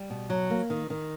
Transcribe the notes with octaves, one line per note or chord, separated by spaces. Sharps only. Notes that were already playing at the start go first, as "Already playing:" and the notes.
Already playing: G3
B2
F#3
A#3
D#3
D#3